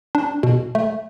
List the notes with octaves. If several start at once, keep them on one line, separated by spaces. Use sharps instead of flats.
D4
B2
A3